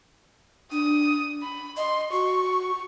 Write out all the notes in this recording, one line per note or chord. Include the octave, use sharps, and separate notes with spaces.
D4 D#6
B5
D#5 C6
F#4 C#6